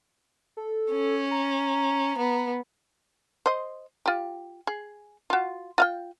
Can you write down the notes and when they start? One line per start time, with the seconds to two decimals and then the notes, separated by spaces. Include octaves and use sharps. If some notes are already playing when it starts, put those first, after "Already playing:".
0.57 A4
0.91 C#4
1.31 A#5
2.18 B3
3.46 C5 D#5
4.06 F4 G4
4.67 G#4
5.30 F4 F#4
5.78 F4 F5 G5